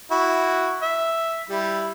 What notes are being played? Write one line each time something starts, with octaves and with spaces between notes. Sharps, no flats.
E4 F#4
E5
G3 E4